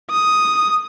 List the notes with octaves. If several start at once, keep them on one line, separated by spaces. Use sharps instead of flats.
D#6